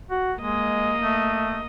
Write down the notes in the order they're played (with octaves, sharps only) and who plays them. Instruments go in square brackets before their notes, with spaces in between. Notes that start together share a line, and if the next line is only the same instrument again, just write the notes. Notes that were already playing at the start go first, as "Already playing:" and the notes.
[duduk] F#4
[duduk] G#3 [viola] A#3 D#5
[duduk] A3